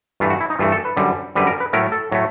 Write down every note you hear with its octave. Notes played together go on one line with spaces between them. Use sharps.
G2 E3 A3 F4
F#4
E4
D#4
G2 E3 A3 F4
A4
B4
F#2 D3 G3
F#2 D3 G3 B4
A#4
B4
A2 F#3 A3 A#4
A4
A2 F#3 A3